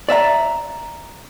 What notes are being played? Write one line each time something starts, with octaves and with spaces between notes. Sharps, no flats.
D5 E5 F5 A#5